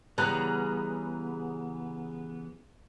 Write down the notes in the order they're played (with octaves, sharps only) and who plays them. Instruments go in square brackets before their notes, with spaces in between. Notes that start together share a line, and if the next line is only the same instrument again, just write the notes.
[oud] C#3 G3 [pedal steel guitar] E3 B3 [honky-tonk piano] B4 A#5 F#6